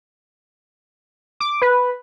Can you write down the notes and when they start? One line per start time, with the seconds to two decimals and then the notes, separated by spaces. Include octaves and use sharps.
1.40 D6
1.62 B4